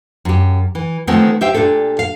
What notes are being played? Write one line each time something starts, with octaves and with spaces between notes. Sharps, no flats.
F#2 G4
E3
D#3 F3 G#3 A3 B3 C4
G4 C5 E5 F5 G5
A#2 D4 G4 A4
F5